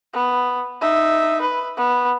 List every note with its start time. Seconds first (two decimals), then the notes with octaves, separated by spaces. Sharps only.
0.14 B3
0.81 D#4 E5
1.41 B4
1.77 B3